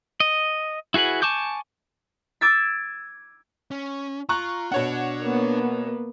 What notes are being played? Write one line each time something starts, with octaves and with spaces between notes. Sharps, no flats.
D#5
E4 F#4 G#4 B4 F#5
G#5 A5 C#6 D6 G6
D6 E6 G#6 A6 B6
C#4
F4 A#5 C#6 F#6
B2 D4 C#5 F#5
A#3 B3